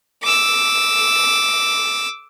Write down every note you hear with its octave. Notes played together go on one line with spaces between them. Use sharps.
D6 E6